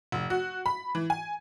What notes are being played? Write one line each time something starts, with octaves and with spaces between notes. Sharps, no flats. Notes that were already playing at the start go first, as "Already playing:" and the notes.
F1
F#4
B5
E3
G#5